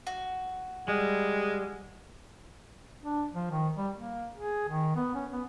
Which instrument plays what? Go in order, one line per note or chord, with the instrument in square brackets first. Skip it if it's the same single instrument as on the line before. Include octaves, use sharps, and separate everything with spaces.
[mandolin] F#4
[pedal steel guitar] G3 [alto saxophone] G#3
[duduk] D4
F3
D#3
G3
A#3
G#4
D#3
B3
C#4
B3